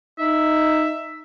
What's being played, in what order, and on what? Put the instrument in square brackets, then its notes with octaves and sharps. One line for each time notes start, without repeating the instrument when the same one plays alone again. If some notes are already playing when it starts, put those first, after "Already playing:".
[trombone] D#4 [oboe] E5